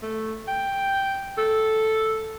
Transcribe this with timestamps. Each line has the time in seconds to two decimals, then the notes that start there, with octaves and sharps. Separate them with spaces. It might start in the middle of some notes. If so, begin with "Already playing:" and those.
0.02 A3
0.48 G5
1.38 A4